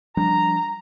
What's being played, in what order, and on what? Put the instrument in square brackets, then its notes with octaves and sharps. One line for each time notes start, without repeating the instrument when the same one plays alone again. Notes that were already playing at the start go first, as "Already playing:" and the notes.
[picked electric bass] F3 G3 D4 [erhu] A#5